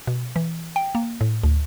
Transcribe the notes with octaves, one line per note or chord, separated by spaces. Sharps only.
B2
E3
G5
A#3
A2
D2